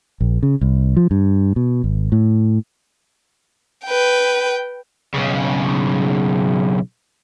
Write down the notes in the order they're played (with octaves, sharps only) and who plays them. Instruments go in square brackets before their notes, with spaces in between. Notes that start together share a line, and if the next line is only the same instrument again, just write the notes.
[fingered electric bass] A#1
C#3
C2
F3
G2
B2
G#1
A2
[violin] B4 G5
[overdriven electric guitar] B1 C#3